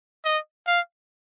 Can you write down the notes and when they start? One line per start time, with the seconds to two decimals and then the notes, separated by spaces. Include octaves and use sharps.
0.25 D#5
0.67 F5